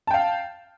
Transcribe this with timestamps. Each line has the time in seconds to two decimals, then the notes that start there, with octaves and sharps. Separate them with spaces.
0.07 A5
0.11 G5
0.14 F5